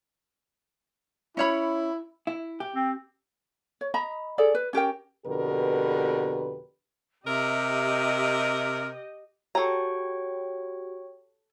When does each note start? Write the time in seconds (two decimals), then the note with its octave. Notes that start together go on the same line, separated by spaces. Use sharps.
1.37 C#4 E4 C#5 B5
2.27 E4
2.60 G4
2.75 C4
3.81 C#5
3.94 D#5 A#5 B5
4.38 G#4 A4 D5
4.55 B4
4.73 C#4 G4 A#4 G5
5.26 F2 B2 D3 G4 A#4 B4
7.27 C3 G4 A#4 D#5 E5
9.55 F#4 G4 A4 C#5 G5 A#5 C#6